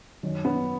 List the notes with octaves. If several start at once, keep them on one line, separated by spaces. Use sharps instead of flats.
F#2 D#3
B3